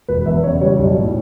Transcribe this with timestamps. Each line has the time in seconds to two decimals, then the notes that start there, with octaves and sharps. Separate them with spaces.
0.08 E1 B4
0.26 E2 E5
0.43 C#3 C#5
0.61 G3 C#5
0.79 B1
0.97 A2